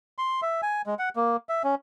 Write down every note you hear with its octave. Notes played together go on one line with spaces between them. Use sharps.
C6
E5
G#5
G#3
F#5
A#3
E5
C#4